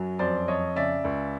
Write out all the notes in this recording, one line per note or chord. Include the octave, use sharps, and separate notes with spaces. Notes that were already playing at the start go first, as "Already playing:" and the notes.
Already playing: F#2 F#3
F2 C5 D5
F2 C#5 D#5
C#3 D5 E5
C#2